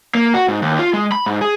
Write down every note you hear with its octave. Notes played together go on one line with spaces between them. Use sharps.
A#3
F#4
G#2
D#2
F4
G#3
B5
G#2
G#4